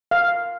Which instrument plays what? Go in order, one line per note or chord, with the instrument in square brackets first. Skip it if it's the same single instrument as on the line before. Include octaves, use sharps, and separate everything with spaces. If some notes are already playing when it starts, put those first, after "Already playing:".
[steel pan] F5